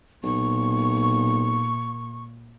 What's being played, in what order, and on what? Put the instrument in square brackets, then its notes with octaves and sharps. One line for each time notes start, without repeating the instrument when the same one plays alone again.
[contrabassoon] B1 [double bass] A#2 [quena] C#6